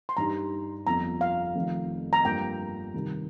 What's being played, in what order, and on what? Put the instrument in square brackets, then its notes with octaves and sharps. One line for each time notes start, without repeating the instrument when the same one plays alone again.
[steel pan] C6
[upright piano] G2 G3 D#4 G4 [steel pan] A#5
[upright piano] G1 F2 F3 [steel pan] A#5
[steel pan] F5
[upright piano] F1 F2 D#3
[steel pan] A#5
[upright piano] G2 F3 A#3 [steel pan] G5
[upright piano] C3 D#3 G3